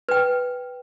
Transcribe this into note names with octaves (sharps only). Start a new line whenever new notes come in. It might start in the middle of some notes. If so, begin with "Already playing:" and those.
B4 G5